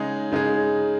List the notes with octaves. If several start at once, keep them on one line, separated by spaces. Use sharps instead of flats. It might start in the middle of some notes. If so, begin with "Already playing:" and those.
Already playing: C#3 G#3 D#4 G#4
C#3 G#3 D#4 G#4